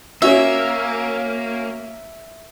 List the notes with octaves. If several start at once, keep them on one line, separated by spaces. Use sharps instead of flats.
A#3 C#4 F#4 E5